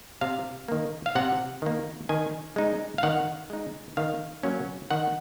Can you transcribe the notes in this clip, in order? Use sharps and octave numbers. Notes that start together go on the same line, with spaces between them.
C3 F5
D#3 A#3
F5
C3 F#5
D#3 A#3
D#3 G#5
G#3 D#4
F5
D#3 F#5
G#3 D#4
D#3 F5
F#3 A#3 C#4
D#3 F#5